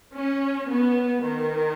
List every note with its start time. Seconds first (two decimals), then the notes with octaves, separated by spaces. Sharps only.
0.12 C#4
0.66 B3
1.20 D#3